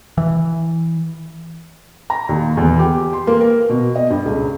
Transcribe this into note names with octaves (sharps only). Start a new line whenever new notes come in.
E3
A#5
D#2
E2
G4
C6
A#3
A#4
B2
D#5
G2
C#2